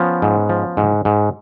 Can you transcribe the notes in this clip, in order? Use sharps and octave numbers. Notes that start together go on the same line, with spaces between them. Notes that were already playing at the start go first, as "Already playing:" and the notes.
Already playing: F3 B3 C#4
G#2
F3
G#2
G#2